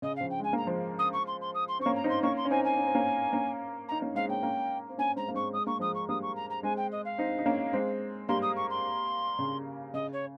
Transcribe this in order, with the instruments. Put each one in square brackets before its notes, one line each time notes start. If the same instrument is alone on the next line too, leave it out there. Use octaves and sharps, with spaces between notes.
[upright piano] C#3 [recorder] D#5
[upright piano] C#3 F3 [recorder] F5
[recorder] G5
[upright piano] G#3 [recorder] G#5
[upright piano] A#3 [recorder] A#5
[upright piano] F3 G#3
[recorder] D#6
C#6
C6
C6
D#6
C6
[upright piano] C4 [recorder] C#6
[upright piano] A#3 C#4
[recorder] A#5
[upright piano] C4 D#4 [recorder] C6
[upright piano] A#3 C#4 [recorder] C#6
[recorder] C6
[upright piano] C#4
[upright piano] C4 D#4 [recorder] G#5
[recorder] G#5
[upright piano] C#4
C4
A#3 C#4
A#3 C#4
[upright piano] D#4 [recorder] A#5
[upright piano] A#3 C#4
[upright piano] G#3 C4 [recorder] F5
[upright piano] A#3 C#4 [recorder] G5
[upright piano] A#3 C#4
C4
[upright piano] A#3 C#4 [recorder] G#5
[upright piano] G#3 C4 [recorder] A#5
[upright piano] A#3
[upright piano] G#3 C4 [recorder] C#6
[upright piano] G#3 [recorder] D#6
[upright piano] A#3 [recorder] C#6
[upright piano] F3 G#3 [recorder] D#6
[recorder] C#6
[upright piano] G3 A#3 [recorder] D#6
[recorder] C#6
A#5
A#5
[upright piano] G#3 C4 [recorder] G#5
[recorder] G5
D#5
F5
[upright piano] C4 D#4
D#4
A#3 C#4
G#3 C4
[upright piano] G3 A#3 [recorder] C6
[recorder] D#6
C#6
C6
[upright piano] C#3
[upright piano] C#3 [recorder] D#5
[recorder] C#5